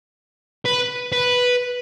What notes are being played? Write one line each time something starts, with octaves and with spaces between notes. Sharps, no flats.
B4
B4